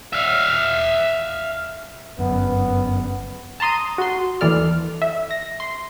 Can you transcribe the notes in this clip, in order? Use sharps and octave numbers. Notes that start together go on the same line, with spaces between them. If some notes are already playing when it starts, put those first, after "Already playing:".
E5 F5
G1 F#2 B3
A5 A#5 C6 D#6 D#7
F#4 C6
D#2 E3 A4 D5 F6
E5
A#6
C6